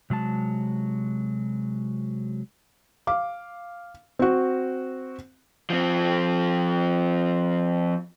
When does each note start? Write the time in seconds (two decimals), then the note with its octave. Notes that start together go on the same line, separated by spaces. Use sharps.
0.10 C3 F#3 G#3 A5
3.07 F5 D6
4.19 C4 F#4
5.70 F3 C4